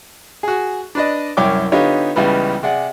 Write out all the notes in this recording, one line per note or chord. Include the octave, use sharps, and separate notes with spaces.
F#4 G#4
D4 B4 D5 D#5
C2 F#2 C#5 G5 D6
D3 B3 D#4 F4 G4 C#5
C#2 C#3 E3 G3 B3
C3 G#4 D5 F#5